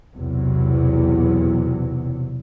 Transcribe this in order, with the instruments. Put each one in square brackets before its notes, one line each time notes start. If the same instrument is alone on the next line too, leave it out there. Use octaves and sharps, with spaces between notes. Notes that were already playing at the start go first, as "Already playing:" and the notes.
[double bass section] B1 E2 C3 F#3